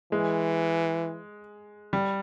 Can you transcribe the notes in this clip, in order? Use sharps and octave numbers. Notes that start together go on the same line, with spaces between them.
E3 G#3
G3